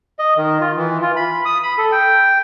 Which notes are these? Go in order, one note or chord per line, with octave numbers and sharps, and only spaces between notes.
D#5
D#3
F4
E3
F4
B5
D#6
B5
A4
G5